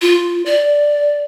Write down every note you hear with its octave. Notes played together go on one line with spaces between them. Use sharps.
F4
D5